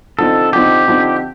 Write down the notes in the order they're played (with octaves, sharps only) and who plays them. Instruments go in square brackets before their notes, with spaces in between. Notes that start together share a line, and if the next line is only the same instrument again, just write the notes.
[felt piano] D3 F3 C4 D#4 [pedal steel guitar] A4
[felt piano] D3 F3 C4 D#4 [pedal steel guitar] G4
[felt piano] D3 F3 C4 D#4